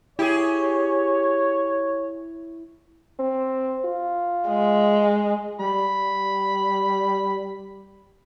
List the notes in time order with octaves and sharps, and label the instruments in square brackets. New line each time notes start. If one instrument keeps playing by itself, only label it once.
[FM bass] E4 [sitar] G4 G#4 [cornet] C#5
[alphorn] C4
F4
[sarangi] G#3
[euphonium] G3 [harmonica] B5